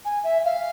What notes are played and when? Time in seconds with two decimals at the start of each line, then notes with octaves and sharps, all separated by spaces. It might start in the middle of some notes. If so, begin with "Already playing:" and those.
0.05 G#5
0.24 E5
0.44 F5